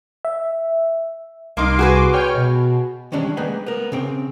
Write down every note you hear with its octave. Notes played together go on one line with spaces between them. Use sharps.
E5
C2 A#3 D#4 C6 D6
F#4 G#4 B4
C#5 G5 F6
B2
D#3 E3 G3 G#3 C#4 D4
G#3 A#3 G#4 B4 F#5 G5
B3 A#4
C#3 C4 G5